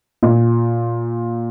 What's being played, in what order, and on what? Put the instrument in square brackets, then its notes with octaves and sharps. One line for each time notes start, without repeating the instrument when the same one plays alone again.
[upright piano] A#2